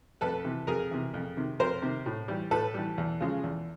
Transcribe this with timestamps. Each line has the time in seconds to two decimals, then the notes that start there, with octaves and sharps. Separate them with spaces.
0.21 F2 A4 B4
0.45 C3 E3
0.67 F2 G#4 A#4
0.91 C3 E3
1.14 F2
1.37 C3 D#3
1.59 F2 A#4 C5
1.82 C3 D#3
2.06 A2
2.28 E3 G3
2.51 A2 A4 B4
2.74 E3 G3
2.98 E2
3.20 C#3 F3 G#3
3.44 E2